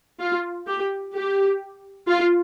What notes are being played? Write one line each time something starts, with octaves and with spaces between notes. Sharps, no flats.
F4
G4
G4
F4